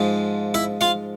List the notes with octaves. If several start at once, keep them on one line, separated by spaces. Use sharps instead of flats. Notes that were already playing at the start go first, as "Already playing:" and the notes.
Already playing: G#2 F3 G#3
E4 E5
F4 F5